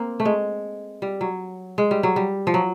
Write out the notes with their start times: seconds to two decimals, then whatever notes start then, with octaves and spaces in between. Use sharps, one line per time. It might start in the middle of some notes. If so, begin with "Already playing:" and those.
Already playing: A#3 C4
0.20 A3
0.25 G#3
1.02 G3
1.21 F#3
1.78 G#3
1.91 G3
2.03 F#3
2.16 G3
2.47 F3
2.54 F#3